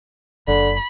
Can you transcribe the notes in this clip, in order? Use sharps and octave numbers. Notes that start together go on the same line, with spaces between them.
F#1 D3 B5